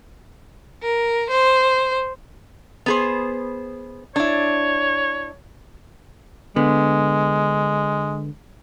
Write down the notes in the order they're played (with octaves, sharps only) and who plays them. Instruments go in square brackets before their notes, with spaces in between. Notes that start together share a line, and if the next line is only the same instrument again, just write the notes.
[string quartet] A#4
C5
[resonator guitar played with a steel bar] B3 G#4 C5
[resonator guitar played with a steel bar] D4 E4 [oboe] C#5
[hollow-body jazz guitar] D3 B3 [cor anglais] G#3